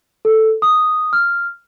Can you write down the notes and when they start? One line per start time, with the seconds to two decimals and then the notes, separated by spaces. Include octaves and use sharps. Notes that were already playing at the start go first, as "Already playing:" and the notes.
0.25 A4
0.62 D#6
1.13 F6